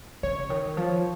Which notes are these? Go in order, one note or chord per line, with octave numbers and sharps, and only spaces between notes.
C#3 C#5
D#3
F3